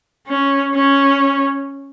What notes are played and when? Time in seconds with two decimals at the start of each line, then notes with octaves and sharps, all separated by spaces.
0.28 C#4
0.75 C#4